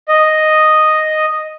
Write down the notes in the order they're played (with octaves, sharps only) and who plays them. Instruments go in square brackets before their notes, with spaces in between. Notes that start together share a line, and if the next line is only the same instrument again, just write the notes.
[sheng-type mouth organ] D#5